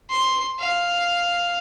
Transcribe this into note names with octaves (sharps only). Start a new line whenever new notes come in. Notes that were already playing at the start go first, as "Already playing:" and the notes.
C6
F5